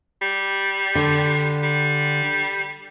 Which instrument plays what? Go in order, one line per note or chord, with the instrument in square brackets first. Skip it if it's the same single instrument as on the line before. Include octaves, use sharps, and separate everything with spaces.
[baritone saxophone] G3
[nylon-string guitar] D3
[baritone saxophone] G3